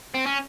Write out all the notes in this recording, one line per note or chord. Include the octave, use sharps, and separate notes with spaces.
C4
C#4